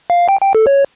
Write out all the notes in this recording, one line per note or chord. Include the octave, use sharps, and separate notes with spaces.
F5
G5
G5
A4
C#5